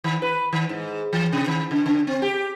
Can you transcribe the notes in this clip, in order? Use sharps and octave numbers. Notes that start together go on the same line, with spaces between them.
D#3
B4
D#3
G#2
E3
C3
D#3
C#3
C#3
C4
G4